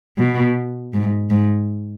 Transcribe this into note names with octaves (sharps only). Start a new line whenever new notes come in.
B2
G#2
G#2